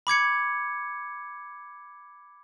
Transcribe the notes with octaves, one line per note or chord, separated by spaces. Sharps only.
B5 D6 G#6 C#7